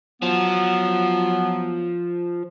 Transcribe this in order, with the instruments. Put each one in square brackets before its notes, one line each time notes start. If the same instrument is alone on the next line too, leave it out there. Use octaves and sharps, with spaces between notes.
[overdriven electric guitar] F3 [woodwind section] F#3 B3